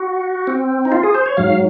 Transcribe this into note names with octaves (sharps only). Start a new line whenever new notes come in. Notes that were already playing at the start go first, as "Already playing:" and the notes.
Already playing: F#4
C4
D#4
F4
G#4
C5
C#5
G#2 F#3 F5